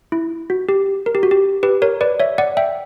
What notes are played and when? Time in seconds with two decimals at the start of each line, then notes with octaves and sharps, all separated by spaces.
0.12 E4
0.50 F#4
0.69 G4
1.06 A#4
1.15 G4
1.23 F#4
1.31 G4
1.63 G4 B4
1.82 A#4 C#5
2.01 B4 D5
2.20 C#5 E5
2.38 D5 F#5
2.57 E5 G5